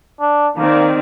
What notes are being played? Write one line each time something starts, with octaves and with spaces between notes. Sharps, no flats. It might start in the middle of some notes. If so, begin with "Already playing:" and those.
D4
D#3 A#3 C4 D5